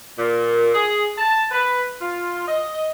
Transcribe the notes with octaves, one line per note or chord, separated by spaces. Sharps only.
A#2
G#4
A5
B4
F4
D#5